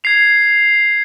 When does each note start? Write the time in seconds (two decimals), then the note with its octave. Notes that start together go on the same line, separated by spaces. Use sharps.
0.04 G#6 C7 F7